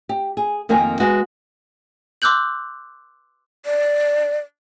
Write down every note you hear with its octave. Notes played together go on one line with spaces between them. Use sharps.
G4
G#4
F2 D#3 A#3 C4 A#4 G#5
G#3 B3 F#4
C6 D6 E6 F#6 G6 F#7
D5